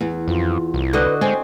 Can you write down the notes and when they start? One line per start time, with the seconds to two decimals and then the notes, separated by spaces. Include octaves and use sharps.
0.01 E2
0.28 F2 F4
0.74 C2
0.93 D3 F#4 B4 D#5
1.21 G#3 C4 C5 G#5